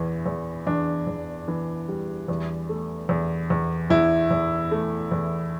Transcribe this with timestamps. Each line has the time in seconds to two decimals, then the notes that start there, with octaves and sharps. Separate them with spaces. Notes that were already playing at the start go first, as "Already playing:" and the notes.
Already playing: E2 E3
0.26 E2
0.67 E2 D4
1.07 E2
1.48 E3
1.88 G3
2.28 E2
2.69 A3
3.09 E2
3.50 E2
3.90 E2 E4
4.31 E2
4.71 A3
5.11 E2